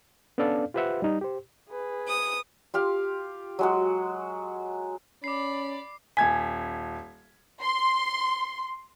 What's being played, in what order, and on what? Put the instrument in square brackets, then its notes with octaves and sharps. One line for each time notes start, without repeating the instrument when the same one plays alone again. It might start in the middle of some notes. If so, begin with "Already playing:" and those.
[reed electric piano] B3 C#4 D4 A4 D5 F5
F4 G4 B4 C5 E5 F#5
G3 D#4
G4 C5
[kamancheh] G#4 B4
[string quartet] D#6
[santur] F4 G4 F5
F#3 G#3 F#4
[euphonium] C#4 [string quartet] D5 B5 [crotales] D6 C7
[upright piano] D#1 G#6 B6 [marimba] G#5
[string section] C6